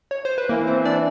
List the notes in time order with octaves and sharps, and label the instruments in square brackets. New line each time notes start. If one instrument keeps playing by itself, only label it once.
[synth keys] C#5
C5
B4
[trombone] E3 [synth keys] A#3 A#4
[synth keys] C4 C5
D4 D5